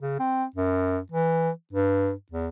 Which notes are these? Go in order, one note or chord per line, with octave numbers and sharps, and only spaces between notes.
C#3
C4
F#2
E3
G2
E2